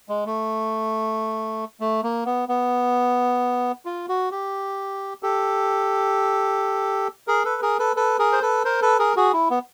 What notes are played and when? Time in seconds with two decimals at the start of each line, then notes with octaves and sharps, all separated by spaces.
0.09 G#3
0.26 A3
1.80 A3
2.03 A#3
2.26 B3
2.49 B3
3.85 F4
4.09 F#4
4.31 G4
5.23 G4 A4
7.27 G#4 A#4
7.44 A4 B4
7.62 G#4 A#4
7.79 A4 B4
7.96 A4 B4
8.19 G#4 A#4
8.32 C5
8.42 A4 B4
8.65 A#4 C5
8.82 A4 B4
8.99 G#4 A#4
9.16 F#4 G#4
9.33 E4
9.50 B3